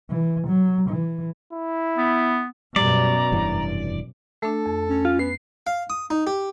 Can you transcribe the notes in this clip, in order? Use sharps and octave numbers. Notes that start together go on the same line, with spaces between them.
E3
F#3
E3
E4
B3
F#2 B2 G3 D5 A#5
F1 G2 E3
A3 D4 A4
F2
C#4
F4
B3 C7
F5
D#6
D#4
G4